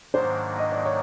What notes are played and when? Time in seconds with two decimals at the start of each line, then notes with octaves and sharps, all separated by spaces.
0.13 G#2 D#3 F#3 A#3 D4 C5
0.58 D#5
0.72 D5
0.85 C#5